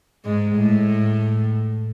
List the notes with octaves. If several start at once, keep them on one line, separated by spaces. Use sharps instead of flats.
G#2 G#3
A2